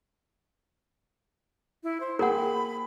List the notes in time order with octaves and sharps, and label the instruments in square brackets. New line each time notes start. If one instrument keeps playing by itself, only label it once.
[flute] E4
C5
[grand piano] A#3 G#4 G5 [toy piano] A#4 F#5 [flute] B5